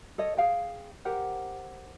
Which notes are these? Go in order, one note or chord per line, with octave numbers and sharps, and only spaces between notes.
A4 C#5 D#5
G#4 F5 G5
G4 A#4 C5 F#5